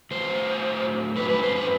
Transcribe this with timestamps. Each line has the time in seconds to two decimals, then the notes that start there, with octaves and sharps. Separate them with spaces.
0.11 A2 F#3 C5
1.16 F#2 F#3 B4
1.29 B4
1.43 C5
1.56 B4